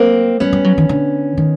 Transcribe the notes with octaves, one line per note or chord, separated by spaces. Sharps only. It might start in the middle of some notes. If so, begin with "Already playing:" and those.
Already playing: F#3 A#3 C4
G3 B3 C#4
G3
F#3
D#3
D3
D#3